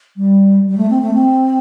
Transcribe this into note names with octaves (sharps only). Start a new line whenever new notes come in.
G3
G3
A3
C4
A3
C4